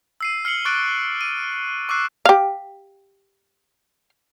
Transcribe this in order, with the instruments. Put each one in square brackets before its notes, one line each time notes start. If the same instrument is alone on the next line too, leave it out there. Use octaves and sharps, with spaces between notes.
[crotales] E6 C7 D#7
F6 C7 C#7 F#7 G7
C#6 D6 F#6 A6 D7
D#7
C#6 D6 E6 F#6 C7
[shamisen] G4 F5